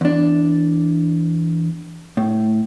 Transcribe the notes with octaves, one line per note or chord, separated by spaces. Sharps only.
E2 D4
A2